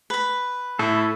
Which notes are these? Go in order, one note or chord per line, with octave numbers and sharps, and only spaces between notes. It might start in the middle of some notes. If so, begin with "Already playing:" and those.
B4 B5
A2 E4 A4